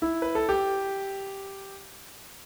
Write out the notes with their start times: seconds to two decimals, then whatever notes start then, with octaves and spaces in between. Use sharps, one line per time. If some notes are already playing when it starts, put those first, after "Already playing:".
0.02 E4
0.22 B4
0.35 A4
0.49 G4